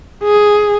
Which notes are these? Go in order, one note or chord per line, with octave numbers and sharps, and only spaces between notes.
G#4